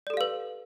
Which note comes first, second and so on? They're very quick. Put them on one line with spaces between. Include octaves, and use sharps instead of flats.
D5 A4 G4 F5 B4